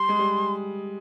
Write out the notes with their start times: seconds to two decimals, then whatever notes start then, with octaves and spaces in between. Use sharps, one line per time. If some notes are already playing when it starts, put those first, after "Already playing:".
Already playing: G3 C6
0.09 G#3
0.19 G3